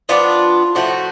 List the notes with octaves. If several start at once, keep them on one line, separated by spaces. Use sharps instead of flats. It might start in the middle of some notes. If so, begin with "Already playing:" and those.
F3 B3 D4 F4
A2 F3 A3 F#4